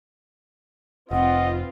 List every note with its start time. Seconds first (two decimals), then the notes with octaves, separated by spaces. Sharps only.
1.11 F1 C4 F4 B4 D#5 F#5